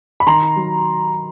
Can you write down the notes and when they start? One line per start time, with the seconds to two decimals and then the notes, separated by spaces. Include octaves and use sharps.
0.20 B5
0.27 D#3 A#5 C6
0.56 F#3